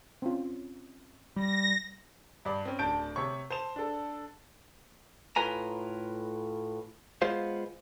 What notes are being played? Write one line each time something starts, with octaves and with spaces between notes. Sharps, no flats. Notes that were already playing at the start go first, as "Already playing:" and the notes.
C4 C#4 F4
G3 A#6
G2 D5
C4 C#4
D1 D4 A5 G6 D7
C3 C#5 C#6
C5 A5 E7
D4 A4
A2 F4 B4 G#5 A#5
G#3 B3 F4 C5 F5